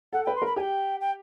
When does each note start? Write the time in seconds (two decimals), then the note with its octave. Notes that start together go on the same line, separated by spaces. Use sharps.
0.13 A4 F#5
0.24 B4 G5
0.35 C6
0.42 A#4 B5
0.56 G4 G5 G#5
1.00 G5